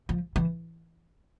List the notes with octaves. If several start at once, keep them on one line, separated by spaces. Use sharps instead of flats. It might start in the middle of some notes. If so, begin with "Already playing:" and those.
F3
E3